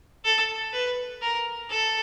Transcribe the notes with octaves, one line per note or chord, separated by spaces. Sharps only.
A4
B4
A#4
A4